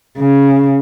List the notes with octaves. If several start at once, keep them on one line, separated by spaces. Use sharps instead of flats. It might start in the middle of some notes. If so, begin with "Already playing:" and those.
C#3